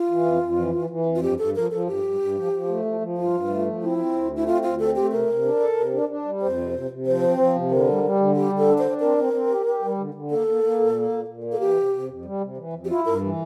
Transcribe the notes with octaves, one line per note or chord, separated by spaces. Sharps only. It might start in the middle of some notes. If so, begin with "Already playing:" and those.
Already playing: F4
E3
F2
F2
E3
E3
E3
F2
F4
G2 G4
G2 A4
F3 A#4
F3 A4
G2 G4
G2
G2
F3
F3
A3
F3
F3
G2 F4
G2
A3
F3
C4 E4
C4
D2
A3
E4
C4 F4
D2 F4
C4 A4
A3 G4
C3 A#4
C3
D4
A4
C3
D4
D4
G3
F2 C5
C3
C3
C3
F3 C5
C4
F3
C3
D3 A#4
G3
G3
D3
G3 G4
D3
A4
D4
C5
D4
C4 A#4
C4
C4
G4
G4
G3
D3
D3
A#3 A4
A#3
A#3
A#2
A#3
A#2
A#2
A#3
A4
E3 G4
C3
C3
F2
G3
C3
E3
F2
G4
E4 F4
G2 A#4
E3